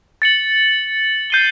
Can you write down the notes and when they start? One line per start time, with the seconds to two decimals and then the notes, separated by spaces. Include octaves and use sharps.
0.22 A6 C#7 F#7
1.30 G6 C7 D#7 G7